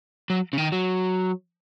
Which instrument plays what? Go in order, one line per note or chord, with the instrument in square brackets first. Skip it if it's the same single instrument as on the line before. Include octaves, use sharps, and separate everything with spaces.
[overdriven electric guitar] F#3
C#3
D#3
F#3